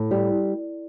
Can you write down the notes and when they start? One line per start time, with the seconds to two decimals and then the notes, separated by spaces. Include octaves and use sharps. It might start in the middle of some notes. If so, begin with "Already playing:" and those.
Already playing: A2
0.11 G3